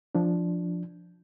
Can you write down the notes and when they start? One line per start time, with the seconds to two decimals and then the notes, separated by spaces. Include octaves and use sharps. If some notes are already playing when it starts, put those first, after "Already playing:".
0.15 F3 D4